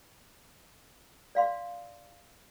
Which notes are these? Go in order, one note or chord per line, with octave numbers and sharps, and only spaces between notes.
D5 F5 C6